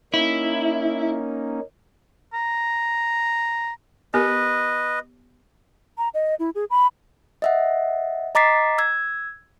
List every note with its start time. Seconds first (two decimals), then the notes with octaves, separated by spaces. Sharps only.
0.14 A#3 C#4 D#4 E4
2.34 A#5
4.14 B3 G4 A#4 B4 D#5
5.98 A#5
6.14 D#5
6.39 E4
6.55 G#4
6.70 B5
7.42 D#5 E5 F#5
8.35 D#5 A#5 D6 A6 B6 C7
8.78 E6 G#6